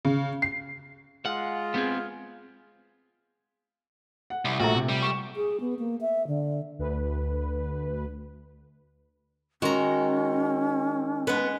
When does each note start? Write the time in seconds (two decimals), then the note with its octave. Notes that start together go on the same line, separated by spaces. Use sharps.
0.05 C#3
0.42 C7
1.26 G#3 F4 F#5
1.74 B3 C4 G#4
4.30 F#5
4.45 C2
4.60 A#1 A3 F#4 A#5
4.74 C3
4.89 G3
5.02 C#6 E7
5.34 G#4
5.60 B3
5.79 A#3
6.01 E5
6.27 D3
6.79 D2 B4
9.62 D#3 G#3 C#4 F#4 A#5
11.27 G#3 B3 B4 F#5